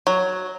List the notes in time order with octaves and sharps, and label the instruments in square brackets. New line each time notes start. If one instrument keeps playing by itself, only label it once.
[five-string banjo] F#3